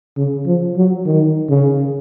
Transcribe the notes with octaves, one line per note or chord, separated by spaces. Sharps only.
C#3
F3
F#3
D#3
C#3